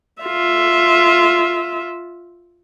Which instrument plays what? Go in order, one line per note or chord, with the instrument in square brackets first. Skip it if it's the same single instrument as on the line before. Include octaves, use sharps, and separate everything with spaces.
[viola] F4 E5